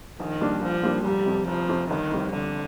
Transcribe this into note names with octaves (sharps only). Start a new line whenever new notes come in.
A#1 D#3
A#2 G3 D4
A#1 F3
A#2 G3 D4
F1 G3
F2 C3
F1 F3
F2 C3
G1 D#3
F2 C3 G3
G1 D3